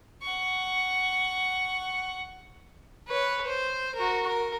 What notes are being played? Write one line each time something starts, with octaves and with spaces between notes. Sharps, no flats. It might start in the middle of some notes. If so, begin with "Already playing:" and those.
F#5 C#6
B4 C#5
C5
F#4 A#4
A#4